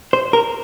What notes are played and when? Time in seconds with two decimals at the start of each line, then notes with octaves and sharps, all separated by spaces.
0.13 C5
0.33 A#4